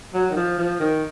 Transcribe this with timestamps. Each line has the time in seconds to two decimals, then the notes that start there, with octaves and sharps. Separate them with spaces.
0.14 F#3
0.30 D#3
0.36 F3
0.58 F3
0.80 D#3